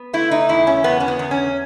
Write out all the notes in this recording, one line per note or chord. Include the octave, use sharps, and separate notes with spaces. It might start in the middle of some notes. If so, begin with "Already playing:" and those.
Already playing: B3
A3 E4
D#4
E2 E4
C#4
E2 B3
C#4
B3
E2
C#4